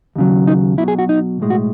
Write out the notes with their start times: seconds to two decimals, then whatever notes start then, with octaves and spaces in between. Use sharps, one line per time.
0.16 D#2 C#3 F#3
0.47 D#4
0.78 B1 B2 F#3 E4
0.88 G#4
0.99 F#4
1.09 D#4
1.40 B1 A2 G#3
1.50 F#4